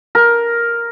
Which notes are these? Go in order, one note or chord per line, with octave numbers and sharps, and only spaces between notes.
A#4